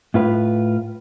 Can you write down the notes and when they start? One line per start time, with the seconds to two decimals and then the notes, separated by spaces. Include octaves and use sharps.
0.14 A2 F4 B4